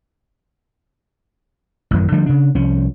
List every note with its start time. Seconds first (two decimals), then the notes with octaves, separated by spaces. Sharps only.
1.91 A1 F#2 D#3
2.12 D3 F3 G3 A3
2.26 C#3 D4
2.55 C2 F3 C#4